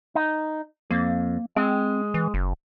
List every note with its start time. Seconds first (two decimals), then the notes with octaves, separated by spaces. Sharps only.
0.15 D#4
0.91 F2 A#3
1.56 G#3 C4
2.14 E3
2.34 F#1